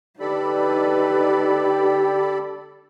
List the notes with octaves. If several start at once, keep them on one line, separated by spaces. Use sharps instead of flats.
D3 D#4 G4 A4 B4 D5 B5